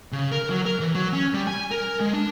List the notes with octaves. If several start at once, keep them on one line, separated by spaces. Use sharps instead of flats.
C#3
A#4
F#3
A#4
E3
F#3
C#4
G3
G#5
A#4
G#3
D4